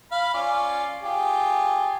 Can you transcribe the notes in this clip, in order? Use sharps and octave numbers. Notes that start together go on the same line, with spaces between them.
F5 B5
C#4 F4 D5
F4 G4 G#4